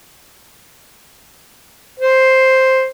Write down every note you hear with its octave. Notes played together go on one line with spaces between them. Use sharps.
C5